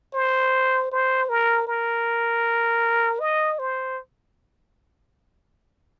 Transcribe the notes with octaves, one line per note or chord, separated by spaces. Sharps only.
C5
C5
A#4
A#4
D#5
C5